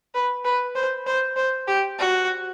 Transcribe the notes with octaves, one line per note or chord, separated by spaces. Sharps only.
B4
B4
C5
C5
C5
G4
F#4